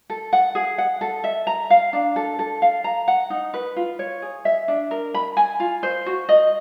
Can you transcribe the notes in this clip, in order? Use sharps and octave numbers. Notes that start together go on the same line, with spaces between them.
A4
F#5
G#4
F#5
A4
E5
A#5
F5
D4
A4
A4
F5
A#5
F#5
D#4
B4
F4
C#5
G#4
E5
D4
A#4
B5
G#5
F4
C5
F#4
D#5